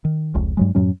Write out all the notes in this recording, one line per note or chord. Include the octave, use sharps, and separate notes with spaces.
D#3
F1 C#2
G2 F#3 G#3
F#2 A2 F#3 C#4